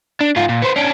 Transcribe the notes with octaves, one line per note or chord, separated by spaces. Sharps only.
D4
G#2 F4
A#2
B3 C5
C#4 D4